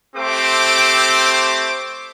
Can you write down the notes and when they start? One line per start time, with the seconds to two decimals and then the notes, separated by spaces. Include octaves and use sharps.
0.16 A3 C4 G4 C5 D6